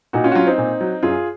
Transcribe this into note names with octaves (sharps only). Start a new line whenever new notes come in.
A#2 D#4 F#4
C#4 F4
F#4
F#3 C#4 F4
C4 D#4
A#2
F#3
F#2 F4 G#4